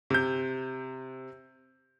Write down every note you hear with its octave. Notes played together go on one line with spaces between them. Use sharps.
C3 G6